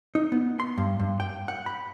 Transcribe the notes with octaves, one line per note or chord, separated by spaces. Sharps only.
D#4
B3
C6
G2
G2
G5
F#5
B5